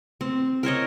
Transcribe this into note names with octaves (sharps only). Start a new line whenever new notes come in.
C4
A#4 C5 C#5 D#5